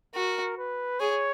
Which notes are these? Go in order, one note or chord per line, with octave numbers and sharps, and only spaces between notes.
F#4 A#4
B4
G#4 C#5